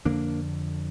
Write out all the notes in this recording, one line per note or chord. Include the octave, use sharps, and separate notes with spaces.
F2 D3 A#3 D4